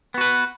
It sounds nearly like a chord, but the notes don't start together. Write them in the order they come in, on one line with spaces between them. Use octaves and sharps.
B3 F#4 B4